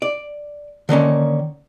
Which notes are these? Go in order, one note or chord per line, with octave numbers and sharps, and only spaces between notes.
D5
D3 D#3 A#3 C#4